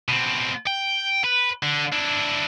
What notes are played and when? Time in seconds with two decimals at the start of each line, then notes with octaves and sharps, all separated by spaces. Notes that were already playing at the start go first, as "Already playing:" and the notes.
0.08 B2 C4
0.67 G5
1.24 B4
1.63 D3
1.92 D4 E4